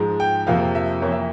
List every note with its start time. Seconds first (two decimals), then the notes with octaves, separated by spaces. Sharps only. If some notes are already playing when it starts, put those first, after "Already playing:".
Already playing: G#2 F3 G#3
0.20 G5
0.47 F2 C3 F3 A#3 F5
0.75 E5
1.02 F2 E3 A#3 C#5
1.12 E5